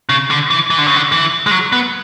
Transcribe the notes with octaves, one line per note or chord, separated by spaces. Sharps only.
C#3
D3
E3
E3
D3
C#3
D3
E3
G#3
F#3
B3